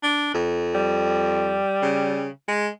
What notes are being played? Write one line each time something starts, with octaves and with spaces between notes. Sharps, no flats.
D4
F2
G3
C#3
G#3